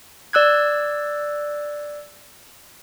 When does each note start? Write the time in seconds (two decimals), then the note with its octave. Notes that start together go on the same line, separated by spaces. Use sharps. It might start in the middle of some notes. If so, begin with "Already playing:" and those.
0.33 D5 E6 F#6 G#6